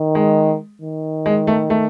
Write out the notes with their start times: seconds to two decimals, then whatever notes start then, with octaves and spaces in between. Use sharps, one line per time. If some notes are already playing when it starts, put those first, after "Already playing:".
Already playing: D#3
0.15 G#3
0.81 D#3
1.26 G#3
1.47 A3
1.70 A3